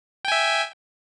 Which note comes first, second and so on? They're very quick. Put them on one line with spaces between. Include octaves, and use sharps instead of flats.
G5 G#5 E5